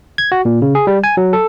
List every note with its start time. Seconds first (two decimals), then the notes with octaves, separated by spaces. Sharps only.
0.18 G#6
0.32 F#4
0.45 A#2
0.62 C#3
0.75 G#4
0.87 G3
1.04 G#5
1.17 F#3
1.33 A4